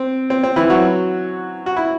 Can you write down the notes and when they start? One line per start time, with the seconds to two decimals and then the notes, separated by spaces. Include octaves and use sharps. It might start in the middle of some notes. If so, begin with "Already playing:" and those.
Already playing: C4
0.30 C4
0.43 C4
0.56 E3 E4
0.70 F#3 F#4
1.66 F#4
1.76 E4